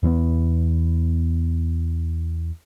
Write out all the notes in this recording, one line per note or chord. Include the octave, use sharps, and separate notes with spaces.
E2 E3 G#3 B3